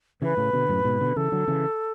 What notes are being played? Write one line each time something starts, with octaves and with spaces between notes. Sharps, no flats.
C#3 E3 B4
A2 C#3
B2 D3
F#2 A2
G#2 B2
B2 D3
C#3 E3 A4
D3 F#3
C#3 E3